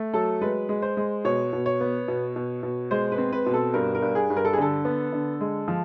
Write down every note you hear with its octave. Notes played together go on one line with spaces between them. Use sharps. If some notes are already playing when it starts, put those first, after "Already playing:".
Already playing: A3
F#3 A4
G#3 B4
G#3
C5
G#3
B2 C#5
B2
C#5
B3
B2
B2
B2
G#3 C5
B4
C4
B4
B2
A4
G2 A#4
A#4
G2
G#4
G2
A#4
A4
G#4
D3 A4
B3
D3
G#3
F3